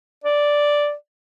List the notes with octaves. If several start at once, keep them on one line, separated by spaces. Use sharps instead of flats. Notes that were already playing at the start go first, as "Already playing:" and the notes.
D5